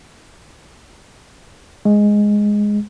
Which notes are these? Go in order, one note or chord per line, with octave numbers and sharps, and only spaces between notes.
G#3